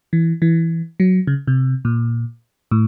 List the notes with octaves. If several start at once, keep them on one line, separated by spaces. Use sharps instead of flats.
E3
E3
F#3
C#3
C3
A#2
A2